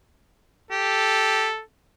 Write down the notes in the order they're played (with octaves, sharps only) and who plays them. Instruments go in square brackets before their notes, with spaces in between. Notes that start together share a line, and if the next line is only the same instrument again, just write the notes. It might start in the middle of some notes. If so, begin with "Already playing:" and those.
[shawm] G4 [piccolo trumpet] A4